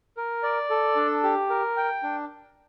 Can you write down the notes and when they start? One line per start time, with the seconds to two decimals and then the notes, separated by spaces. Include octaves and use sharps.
0.17 A#4
0.43 D5
0.70 A4
0.96 D4
1.23 G4
1.50 A#4
1.77 G5
2.03 D4